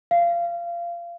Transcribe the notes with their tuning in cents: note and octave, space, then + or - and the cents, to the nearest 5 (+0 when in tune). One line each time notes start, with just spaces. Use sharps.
F5 -25